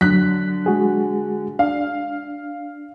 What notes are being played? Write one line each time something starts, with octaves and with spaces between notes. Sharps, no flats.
D3 F#3 F#6 B6
G#3 F#4 G#4
D4 F5